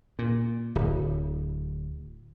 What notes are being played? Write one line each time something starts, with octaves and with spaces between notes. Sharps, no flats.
A#2
D1